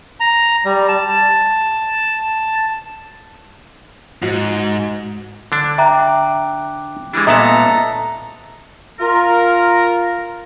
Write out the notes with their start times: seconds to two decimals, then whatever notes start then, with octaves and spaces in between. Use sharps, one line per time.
0.20 A#5
0.65 G3
0.88 A5
4.23 G#2 F#4
5.52 D3 D4
5.78 E5 G5 A#5 D6 F#6
7.13 E3 G3 G#3 D4
7.27 A#2 B3 A4 D#5 E5 A5 A#5 D#6
9.00 F4 A#4